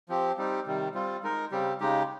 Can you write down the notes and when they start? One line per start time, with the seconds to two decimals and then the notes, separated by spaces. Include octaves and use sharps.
0.09 F3 C4 G4
0.37 G3 C4 D#4 G4
0.66 C3 D#3 G3
0.94 G3 C4 F4
1.23 G#3 D#4 A#4
1.51 C#3 G3 C4 G4
1.80 C#3 G#3 D#4 G4